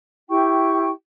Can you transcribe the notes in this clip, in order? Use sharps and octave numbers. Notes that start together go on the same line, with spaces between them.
E4 G4 G5 C#6